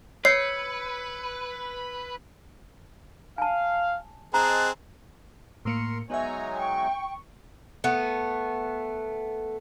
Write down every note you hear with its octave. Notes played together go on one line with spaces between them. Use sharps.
B4 C#5 E6 G#6 C7 C#7
F5 G#5 A5
C4 G#4 D#5 A5 A#5 F#6
A2 A#3 A#4 C6 C#7
F#3 G#3 B3 D#4 C#5 E5 G#5 A#5
G5 C#6
A3 B3